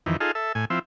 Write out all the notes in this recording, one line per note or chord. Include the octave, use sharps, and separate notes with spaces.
F2 D#3 E3
D#4 F4 G#4 A4
A4 E5
A2 G#5
F3 C4 E4